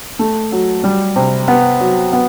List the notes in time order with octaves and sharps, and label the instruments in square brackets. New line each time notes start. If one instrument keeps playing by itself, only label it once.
[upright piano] A3
F#3
G3
C3
B3
F#3
B3